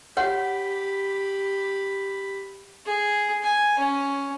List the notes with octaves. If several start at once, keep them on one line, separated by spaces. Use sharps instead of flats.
G4 C#5 F#5 B5
G#4
G#5
C#4